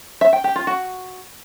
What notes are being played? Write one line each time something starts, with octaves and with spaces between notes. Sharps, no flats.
E5
G5
G4
F4
F#4